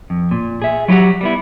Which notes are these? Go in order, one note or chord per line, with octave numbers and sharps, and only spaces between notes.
F2
A#2
G#4 E5
F#3 E4 F#4 G4 F#5
G3 B3 E4